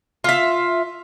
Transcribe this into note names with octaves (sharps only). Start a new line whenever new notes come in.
F4 E5